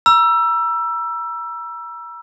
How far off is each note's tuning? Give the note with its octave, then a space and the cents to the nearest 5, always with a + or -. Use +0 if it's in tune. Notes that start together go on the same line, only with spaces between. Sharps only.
A#5 +40 E6 +15